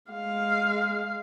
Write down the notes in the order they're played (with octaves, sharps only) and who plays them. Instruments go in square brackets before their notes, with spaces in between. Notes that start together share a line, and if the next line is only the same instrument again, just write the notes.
[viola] G#3 F5